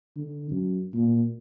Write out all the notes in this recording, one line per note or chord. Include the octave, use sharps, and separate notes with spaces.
D3
F#2
A#2